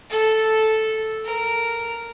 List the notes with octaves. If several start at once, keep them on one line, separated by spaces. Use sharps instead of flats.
A4
A#4